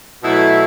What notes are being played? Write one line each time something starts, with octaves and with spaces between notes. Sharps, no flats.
B2 F#3 A3 E4